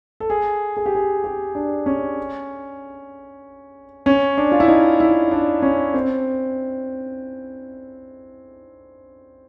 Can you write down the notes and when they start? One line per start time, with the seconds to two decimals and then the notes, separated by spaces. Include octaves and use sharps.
0.20 A4
0.30 G#4
0.77 G#4
0.86 G4
0.95 G#4
1.24 G4
1.55 D4
1.86 C#4
4.06 C#4
4.38 D4
4.52 F4
4.60 E4
4.68 D#4
5.00 E4
5.31 D4
5.62 C#4
5.94 C4